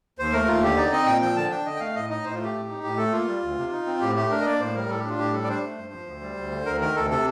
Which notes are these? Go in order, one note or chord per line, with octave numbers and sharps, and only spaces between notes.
D#2 C5
A3 A#4
D#2 F4
D3 G4
D#4 D5
C4 D#5
A#2 G5
F3 G5
D3 A5
D4 G5
D3 D#5
G5
A3 F5
A2 D#5
D#4 D#5
A2 C5
A3 F4
G4
A2
D#4
A2 G4
A3 A4
A#3 F4
G3
D2
C3
D#4
C4
A2 G4
A3 G4
D4 A#4
D#5
A#3 D5
A2 C5
G3 A#4
A2 A4
G4
D4 F4
A2 G4
G3 A4
D5
D4 C5
A3
G2
F3
D2
G3
D2
D3
D2 A#4
D#3 A#4
D2 A4
C3 A4